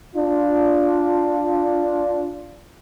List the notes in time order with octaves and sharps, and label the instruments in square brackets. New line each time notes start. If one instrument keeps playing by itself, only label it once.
[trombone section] D4 F4